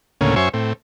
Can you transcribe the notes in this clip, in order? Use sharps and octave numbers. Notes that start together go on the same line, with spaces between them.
D2 A2 C#3 A#3 C#4
F#2 C#4 C5 E5 G#5 C#6
A2 C4